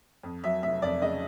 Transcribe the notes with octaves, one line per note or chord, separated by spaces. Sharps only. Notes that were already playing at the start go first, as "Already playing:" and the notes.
F2
F#3 E5
F1 E5
F2 D5
C#3 D#5